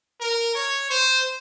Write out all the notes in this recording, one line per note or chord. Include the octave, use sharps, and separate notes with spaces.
A#4
C#5
C5